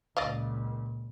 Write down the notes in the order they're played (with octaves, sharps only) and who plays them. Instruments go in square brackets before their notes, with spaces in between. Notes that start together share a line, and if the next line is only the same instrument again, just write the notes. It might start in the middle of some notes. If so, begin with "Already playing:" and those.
[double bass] C#2 A#2 [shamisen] D5 D#5 F5